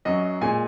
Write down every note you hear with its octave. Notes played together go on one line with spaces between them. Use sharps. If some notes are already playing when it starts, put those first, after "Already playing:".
F#2 F#3 D#5
A#2 G#3 G#5